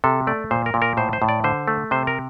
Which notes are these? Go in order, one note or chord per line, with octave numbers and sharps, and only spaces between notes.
C3 A4
A3 D5
A#2 C5
A#4
A#2
A#4
A2 C5
C5
A2
D5
D3 C5
A3
C3 C5
A#4